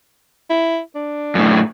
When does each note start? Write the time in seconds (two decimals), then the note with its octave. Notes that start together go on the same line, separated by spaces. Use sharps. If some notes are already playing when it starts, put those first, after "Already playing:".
0.50 E4
0.95 D4
1.35 F#2 A2